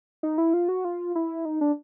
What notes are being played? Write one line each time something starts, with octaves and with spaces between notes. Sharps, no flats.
D#4
E4
F4
F#4
F4
E4
D#4
D4